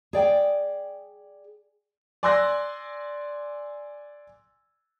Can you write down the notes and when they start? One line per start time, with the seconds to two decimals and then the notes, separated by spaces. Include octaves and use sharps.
0.13 G#4 D5 G5
2.23 D5 G#5 C6 E6 F#6 A#6